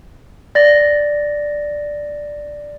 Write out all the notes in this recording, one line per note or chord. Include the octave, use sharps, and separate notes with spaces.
D5 A6 A#6